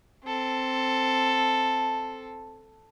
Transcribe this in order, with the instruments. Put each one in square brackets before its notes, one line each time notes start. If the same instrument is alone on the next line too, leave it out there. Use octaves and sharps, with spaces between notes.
[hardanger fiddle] C4 A4